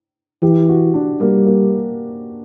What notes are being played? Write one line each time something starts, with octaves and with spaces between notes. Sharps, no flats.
E3 G4
F#4
D4
G3 A#3
A#3